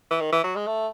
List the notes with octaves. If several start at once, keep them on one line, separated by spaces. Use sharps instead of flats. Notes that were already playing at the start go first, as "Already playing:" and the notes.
E3
D#3
E3
F#3
G#3
A3